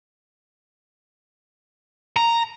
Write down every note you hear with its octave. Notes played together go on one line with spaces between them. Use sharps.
A#5